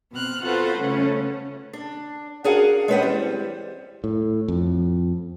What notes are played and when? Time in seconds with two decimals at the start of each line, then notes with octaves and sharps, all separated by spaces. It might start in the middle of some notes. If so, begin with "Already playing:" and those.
0.13 B2 C4 F6 F#6
0.43 F4 F#4 A4 B4 C5 F#5
0.79 C#3 A3 C#4
1.73 D4
2.44 D4 F#4 G#4 A#4 F5 F#5
2.88 G#3 C#4 D4 B4 C5 F#5
3.02 E3 G3 C4
4.04 A2
4.48 F2